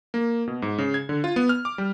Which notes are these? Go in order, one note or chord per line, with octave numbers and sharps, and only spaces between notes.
A#3
B2
G#2
C#3
G#6
D3
F4
B3
F6
D6
G3